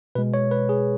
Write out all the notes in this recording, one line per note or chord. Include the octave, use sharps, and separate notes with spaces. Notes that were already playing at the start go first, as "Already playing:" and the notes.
B2 G#3 B4
C#5
B4
G#4